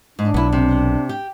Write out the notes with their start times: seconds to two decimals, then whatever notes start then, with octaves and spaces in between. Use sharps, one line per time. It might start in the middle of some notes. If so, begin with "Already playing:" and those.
0.19 G#2 D4
0.34 B1 B3 E4
0.52 C3
1.09 G4